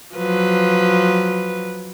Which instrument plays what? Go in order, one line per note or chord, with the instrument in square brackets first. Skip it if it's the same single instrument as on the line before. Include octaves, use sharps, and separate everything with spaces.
[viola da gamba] F3 F#3 B4